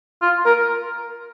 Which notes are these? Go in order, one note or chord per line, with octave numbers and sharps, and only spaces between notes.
F4
A#4